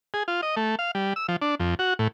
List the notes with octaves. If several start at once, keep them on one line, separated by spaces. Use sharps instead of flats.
G#4
F4
D#5
A3
F5
G3
E6
F3
D4
F2
F#4
A2